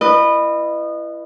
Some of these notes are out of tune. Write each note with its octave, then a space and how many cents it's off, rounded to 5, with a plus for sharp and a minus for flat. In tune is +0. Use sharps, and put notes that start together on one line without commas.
E4 +30 B4 +0 D#5 -30